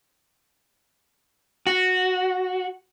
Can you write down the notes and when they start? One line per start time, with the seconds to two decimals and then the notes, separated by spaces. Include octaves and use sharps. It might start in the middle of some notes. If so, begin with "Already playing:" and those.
1.67 F#4